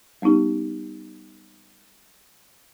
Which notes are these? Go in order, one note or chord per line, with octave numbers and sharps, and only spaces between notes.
G3 B3 C#4 D#4 G4